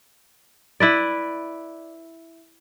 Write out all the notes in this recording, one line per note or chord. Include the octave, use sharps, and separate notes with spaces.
E4 B4 D5